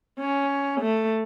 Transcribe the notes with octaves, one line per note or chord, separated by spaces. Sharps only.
C#4
A3